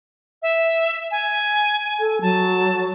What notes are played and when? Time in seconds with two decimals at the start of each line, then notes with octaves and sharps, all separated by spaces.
0.42 E5
1.11 G#5
2.00 A4
2.22 F#3 A5